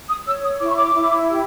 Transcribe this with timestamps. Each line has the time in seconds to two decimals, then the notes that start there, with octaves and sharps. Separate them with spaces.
0.08 D#6
0.26 C#5 E6
0.43 D#6
0.60 E4 D6
0.68 C#6
0.75 D6
0.95 E4
1.29 G4